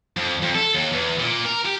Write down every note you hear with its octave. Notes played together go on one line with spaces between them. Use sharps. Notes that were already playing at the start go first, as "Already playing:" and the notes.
F2
F2
A4
D#2
E2
A#2
A#4
G4